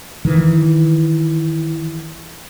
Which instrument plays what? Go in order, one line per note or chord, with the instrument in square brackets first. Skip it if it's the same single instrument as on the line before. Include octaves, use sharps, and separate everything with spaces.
[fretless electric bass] D#3 E3